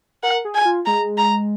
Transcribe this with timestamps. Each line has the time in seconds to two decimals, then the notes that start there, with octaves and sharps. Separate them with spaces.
0.23 A#4 F#5
0.45 G#4
0.55 G#5
0.65 F4
0.86 G#3 A#5
1.18 A#5